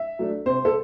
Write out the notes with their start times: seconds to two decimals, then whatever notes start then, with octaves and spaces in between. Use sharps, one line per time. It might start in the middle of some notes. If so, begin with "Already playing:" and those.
Already playing: E5
0.19 F#3 A3 D4
0.46 C3 C5
0.65 A4